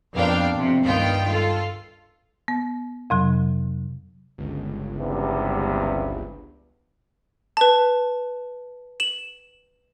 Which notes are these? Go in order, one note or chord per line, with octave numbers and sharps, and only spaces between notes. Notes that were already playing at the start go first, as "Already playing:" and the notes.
F2 B3 D4 A#4 F5 G5
F2 C3
C#2 G2 D#3 B3 F4 G5
F4 A4
B3
F2 C3 F#3
G1 C#2
E2 G2 C3
B4 A5
E7 F#7